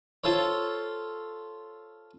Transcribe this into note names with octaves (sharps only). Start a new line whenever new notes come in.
F4 A4 C5 C#5